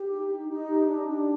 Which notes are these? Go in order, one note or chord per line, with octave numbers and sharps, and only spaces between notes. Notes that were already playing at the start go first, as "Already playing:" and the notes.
Already playing: G4
D#4
D#4
D#4
G4
D4
D4